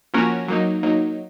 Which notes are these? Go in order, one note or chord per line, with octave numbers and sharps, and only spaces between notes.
F3 A#3 C#4 F#4 A#4
F#3 A#3 D#4
F#3 A#3 D#4